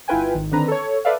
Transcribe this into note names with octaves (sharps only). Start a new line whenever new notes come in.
G1 E4 F4 B4 G5 G#5
G#1 D#3
D3 D#3 C4 D4 B4 A#5
A4 C#5
A4 B4 D5 E5 F5